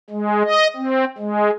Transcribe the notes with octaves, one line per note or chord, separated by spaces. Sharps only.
G#3
D#5
C4
G#3